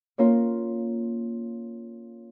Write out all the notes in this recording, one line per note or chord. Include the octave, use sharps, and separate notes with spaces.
A#3 C#4 F4 A#4 C#5